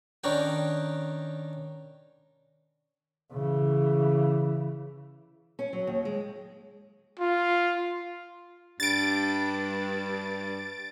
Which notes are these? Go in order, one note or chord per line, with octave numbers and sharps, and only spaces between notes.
D#3 C#4 D4 A#4 B4 G5
C#3 E3
C#4
F#3
D#2
G#3
F4
G2 A6 D7